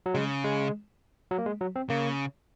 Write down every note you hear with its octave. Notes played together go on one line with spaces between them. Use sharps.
F#3
C#3 G#3
G#3
F#3
A#3
G#3
F#3
C4
C#3 A#3